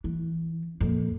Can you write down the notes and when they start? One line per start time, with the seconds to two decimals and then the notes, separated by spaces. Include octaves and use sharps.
0.04 E3
0.81 F2 A#2